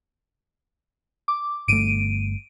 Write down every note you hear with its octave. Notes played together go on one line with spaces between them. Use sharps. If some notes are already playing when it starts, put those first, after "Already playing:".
D6
G1 A3 D7 D#7